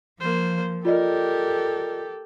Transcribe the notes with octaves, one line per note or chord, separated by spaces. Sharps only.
F3 A#3 C5
F4 G4 A4 A#4 D5 D#5